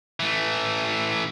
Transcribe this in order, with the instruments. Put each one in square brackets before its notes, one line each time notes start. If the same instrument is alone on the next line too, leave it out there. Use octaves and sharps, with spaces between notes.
[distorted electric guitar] E3 A3